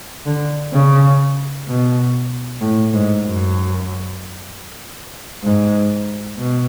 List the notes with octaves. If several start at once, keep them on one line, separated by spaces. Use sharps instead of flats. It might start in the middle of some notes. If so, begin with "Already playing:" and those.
D3
C#3
B2
A2
G#2
F#2
G#2
B2